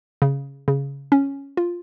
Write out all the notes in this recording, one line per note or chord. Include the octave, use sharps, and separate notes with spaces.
C#3
C#3
C#4
F4